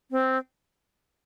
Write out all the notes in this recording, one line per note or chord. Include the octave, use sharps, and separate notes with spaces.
C4